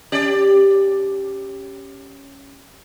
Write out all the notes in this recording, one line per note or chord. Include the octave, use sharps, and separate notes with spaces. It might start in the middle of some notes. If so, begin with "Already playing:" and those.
C#4 G4 D5